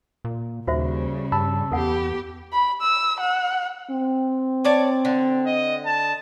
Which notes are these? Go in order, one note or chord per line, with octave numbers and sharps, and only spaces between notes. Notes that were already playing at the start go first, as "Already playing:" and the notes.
A#2
D#2 C#3 G3 F#4 C5 E5
G2 A5 B5 E6
E2 B3 G4 A4 F#5
B5
E6
F#5
C4
C#5 D5 A5
D3
D#5
A5